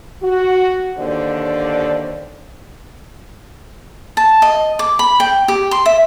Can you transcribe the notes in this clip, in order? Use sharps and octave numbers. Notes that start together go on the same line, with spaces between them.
F#4
D#2 D3 C5 D5
A5
D#5
D6
B5
G5
G4
C6
E5